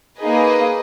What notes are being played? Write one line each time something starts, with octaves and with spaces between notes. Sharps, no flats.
A#3 D#4 G#4 B4 D#5